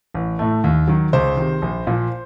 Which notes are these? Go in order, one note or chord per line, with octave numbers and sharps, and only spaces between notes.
A1
A2 A3
D#2
D#3 F#3
C#2 C5
C3 D#3
A#1
A#2 F3